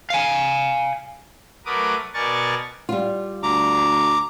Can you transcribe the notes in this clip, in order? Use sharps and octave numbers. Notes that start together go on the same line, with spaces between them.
F5 G#5
F#3 A3 A#4 B4 D6 D#6
B2 A#4 D5 G#5 C#6 A6
G3 F4
D2 A#5 D6